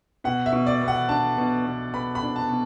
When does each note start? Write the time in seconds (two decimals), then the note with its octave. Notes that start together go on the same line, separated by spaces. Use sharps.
0.24 B2 F#5
0.46 E5
0.53 B2
0.67 D5
0.81 B3
0.88 F#5
1.09 D4 A5
1.38 B2
1.66 B2
1.93 B3 B5
2.15 B5
2.22 D4
2.36 A5
2.49 B2